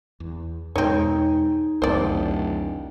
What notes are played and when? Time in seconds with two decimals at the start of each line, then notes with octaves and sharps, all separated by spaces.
0.20 E2
0.76 E2 B2 G#3 C4 D#4 G#4 C#5
1.82 D1 C2 F2 D#3 C5 D5